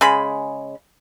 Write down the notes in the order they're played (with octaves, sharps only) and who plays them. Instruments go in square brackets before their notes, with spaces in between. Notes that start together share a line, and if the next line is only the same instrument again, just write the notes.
[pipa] C#3 G#3 B5